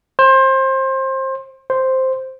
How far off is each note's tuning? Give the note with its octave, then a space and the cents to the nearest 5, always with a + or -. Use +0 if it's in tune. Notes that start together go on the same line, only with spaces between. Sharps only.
C5 +25
C5 +0